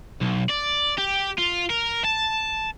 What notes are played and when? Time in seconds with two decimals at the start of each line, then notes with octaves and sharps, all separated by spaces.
0.21 B1
0.49 D5
0.98 G4
1.38 F4
1.70 A#4
2.05 A5